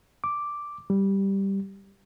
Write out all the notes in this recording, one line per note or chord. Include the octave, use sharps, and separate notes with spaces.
D6
G3